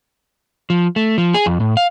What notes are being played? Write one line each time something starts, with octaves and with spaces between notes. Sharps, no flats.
F3
A3
F3
G#4
F2
A2
F5